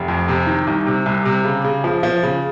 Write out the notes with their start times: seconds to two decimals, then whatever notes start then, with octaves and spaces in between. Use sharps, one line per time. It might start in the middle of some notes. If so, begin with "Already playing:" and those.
Already playing: F1
0.08 F2
0.28 C3
0.47 D#3
0.67 C2
0.87 C3
1.06 C2
1.25 C3
1.45 C#3
1.64 C#3
1.84 F3
2.03 F3
2.23 C#3